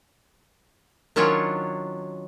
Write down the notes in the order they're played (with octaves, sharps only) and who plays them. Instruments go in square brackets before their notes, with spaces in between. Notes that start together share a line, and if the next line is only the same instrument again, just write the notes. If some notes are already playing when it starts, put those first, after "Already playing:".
[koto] D#3 F#3 C#4 D4 F4 C#5